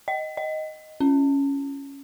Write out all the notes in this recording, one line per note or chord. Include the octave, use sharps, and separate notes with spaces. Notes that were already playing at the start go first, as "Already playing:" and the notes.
D#5
D#5
C#4